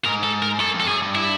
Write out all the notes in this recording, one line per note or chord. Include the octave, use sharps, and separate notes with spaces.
G#2 A#4
A4
A#4
F#2 A4
F2
A4
F#2 G#4
G2
E4